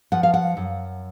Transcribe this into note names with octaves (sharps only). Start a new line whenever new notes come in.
F3 F#5
F5
F#5
F#2